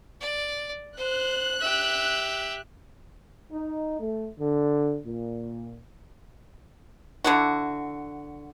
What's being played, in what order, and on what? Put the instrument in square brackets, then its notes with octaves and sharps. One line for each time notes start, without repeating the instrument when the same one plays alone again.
[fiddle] D5
[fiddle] C5 [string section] F#6
[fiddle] G4 E5
[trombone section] D#4
A3
D3
A#2
[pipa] D3 E4 F#4